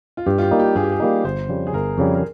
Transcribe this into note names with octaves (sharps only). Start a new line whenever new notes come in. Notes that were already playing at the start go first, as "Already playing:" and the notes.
F4
G2 G4
F4
G4
G3 A#3 D#4
G4
G2 G#4
G4
G#4
G3 A#3 D#4
G1 C5
F2 C#3 G3
G#4
G1 A#4
F2 C#3 G3
A#4